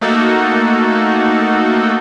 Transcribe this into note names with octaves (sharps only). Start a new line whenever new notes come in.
A3 A#3 D#4 F#4 A4